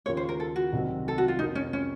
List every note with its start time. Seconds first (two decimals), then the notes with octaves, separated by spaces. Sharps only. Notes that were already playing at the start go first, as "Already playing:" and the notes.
0.06 D#2 C#3 F3 A#3 F4 C#5
0.17 C5
0.29 A#4
0.40 A4
0.56 F#4
0.73 C2 C3 D#3 F#3 C4
1.08 A4
1.18 F#4
1.28 F4
1.39 F2 C3 F3 A#3 D#4
1.55 C#4
1.73 C#4